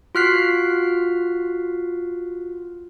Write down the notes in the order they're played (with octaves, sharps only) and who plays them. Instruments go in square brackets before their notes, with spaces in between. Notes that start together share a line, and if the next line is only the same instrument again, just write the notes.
[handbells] F4 F#4 F6 F#6 B6 C7